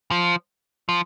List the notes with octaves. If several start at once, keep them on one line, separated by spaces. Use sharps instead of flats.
F3
F3